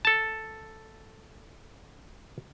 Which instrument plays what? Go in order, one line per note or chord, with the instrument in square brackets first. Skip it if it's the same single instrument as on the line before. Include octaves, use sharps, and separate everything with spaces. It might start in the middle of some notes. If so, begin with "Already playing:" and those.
[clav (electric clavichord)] A4 A5